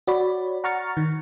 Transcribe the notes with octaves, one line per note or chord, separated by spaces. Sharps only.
F#4 C#5 D5 B5
F#5 A#5 C#6 F6 A6 C#7
D#3